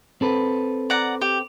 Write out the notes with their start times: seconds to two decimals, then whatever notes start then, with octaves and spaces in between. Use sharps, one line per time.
0.21 C4 A4 B4
0.90 D5 F#5 A#5
1.21 G4